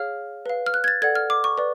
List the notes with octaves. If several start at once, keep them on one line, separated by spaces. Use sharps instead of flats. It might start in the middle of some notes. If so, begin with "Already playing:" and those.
Already playing: G#4 C#5 F5 F6
B4 F5
F6
F#6
G#6
A6
A4 D5 F#5 G#6
F6
D6
C#6
B4 D5